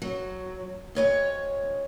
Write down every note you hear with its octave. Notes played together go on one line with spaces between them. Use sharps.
F#3
D2 D#3 C#5 D#5